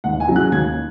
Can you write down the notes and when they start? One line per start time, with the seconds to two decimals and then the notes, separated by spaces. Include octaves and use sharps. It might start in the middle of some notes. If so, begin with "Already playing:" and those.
0.04 D#2 F#5
0.20 G#5
0.27 C#3 F#3
0.36 F#6
0.52 D#2 G#6